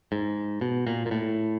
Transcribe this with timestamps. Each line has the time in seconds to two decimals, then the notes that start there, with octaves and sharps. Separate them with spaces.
0.12 G#2
0.61 B2
0.87 A#2
1.06 A#2
1.11 A2